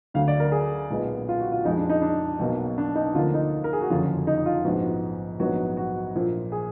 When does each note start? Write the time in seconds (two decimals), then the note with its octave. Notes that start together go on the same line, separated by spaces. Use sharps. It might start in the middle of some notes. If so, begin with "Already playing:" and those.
0.14 D2 D3 F#3 F5
0.28 D5
0.40 A#4
0.52 G#4
0.90 B1 A#2 G#3 B3
1.29 F4
1.40 F#4
1.52 F4
1.64 F2 F3 G#3 D#4
1.77 D4
1.90 D#4
2.02 D4
2.39 B1 B2 F#3 A#3
2.78 D4
2.95 D#4
3.14 D2 D3 F3 A#3 F4
3.34 D#4
3.64 A#4
3.73 G#4
3.81 F#4
3.90 F#1 F2 D3 F#3 F4
4.27 D#4
4.46 F4
4.64 A#1 G#2 F3 B3 F#4
5.39 A#1 G#2 F#3 B3 F#4
5.77 F#4
6.15 A#1 A#2 F3
6.52 G#4